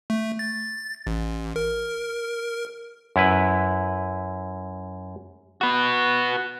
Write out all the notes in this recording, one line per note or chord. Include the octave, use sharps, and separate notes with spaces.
A3
A6
A1
A#4
F#2 E4 B4
F#4 B4